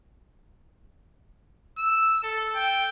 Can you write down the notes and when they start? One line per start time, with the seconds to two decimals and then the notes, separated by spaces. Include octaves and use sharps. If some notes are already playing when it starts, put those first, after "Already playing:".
1.78 E6
2.23 A4
2.55 G5